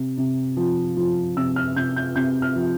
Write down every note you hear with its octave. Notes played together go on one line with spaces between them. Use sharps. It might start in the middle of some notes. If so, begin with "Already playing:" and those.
Already playing: C3
C3
F3
F3
C3 E6
F6
C3 G6
G6
C3 G6
F6
F3